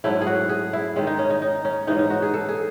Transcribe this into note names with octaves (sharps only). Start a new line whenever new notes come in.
G#2 F#3 A3 C#4 E4
G#4
F#4
G#4
E4
D#3 G#3 C#4
D#4
C#4
D#4
D#4
C#4
G#2 E3 G#3 C#4 D#4
D#4
F#4
G#4
A4
G#4